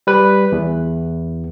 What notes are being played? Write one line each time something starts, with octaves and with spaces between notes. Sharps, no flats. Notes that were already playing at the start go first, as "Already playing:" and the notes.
G3 B4
E2